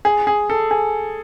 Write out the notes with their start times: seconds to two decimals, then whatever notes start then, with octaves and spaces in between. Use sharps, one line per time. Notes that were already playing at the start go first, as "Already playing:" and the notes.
0.05 G#4
0.27 G#4
0.50 A4
0.71 G#4